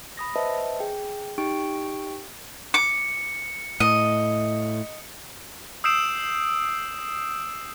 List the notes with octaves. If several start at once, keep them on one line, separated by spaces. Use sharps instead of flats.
B5 D#6 A#6
B4 C5 D#5 E5 A5
G#4 G5
D#4 G4 G5 C#6 D7
D6 C#7
A2 D#5
D#6 E6 G6 C7 D7 E7